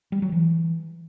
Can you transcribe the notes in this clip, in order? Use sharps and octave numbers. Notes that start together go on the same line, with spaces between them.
G3
F#3
E3